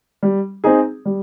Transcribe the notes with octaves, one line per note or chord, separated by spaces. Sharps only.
G3
C4 D#4 G#4
G3